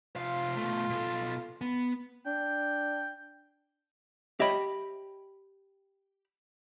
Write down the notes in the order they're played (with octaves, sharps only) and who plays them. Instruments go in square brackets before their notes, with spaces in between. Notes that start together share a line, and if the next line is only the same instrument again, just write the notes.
[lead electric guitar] C3 F5 [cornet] F4
[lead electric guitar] B2 A3
B2 A4
B3
[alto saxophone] D4 [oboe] G5
[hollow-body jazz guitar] G4 B5 [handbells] C#5 D#5 E5